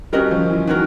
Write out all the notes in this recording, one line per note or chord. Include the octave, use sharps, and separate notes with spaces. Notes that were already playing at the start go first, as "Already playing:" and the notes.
G3 C#4 F#4 A#4 D#5
F3
E3
D#3 C#4 F#4 A#4